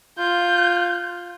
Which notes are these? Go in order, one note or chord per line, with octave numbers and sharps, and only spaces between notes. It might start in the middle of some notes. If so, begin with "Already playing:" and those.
F4 G6